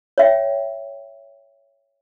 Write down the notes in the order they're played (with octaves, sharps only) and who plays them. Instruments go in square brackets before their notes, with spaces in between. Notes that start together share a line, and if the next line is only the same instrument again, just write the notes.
[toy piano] C#5 E5 G5